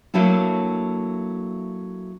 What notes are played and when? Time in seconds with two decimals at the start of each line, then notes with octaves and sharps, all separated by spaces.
0.14 F#3 A3 A#3 D4 E4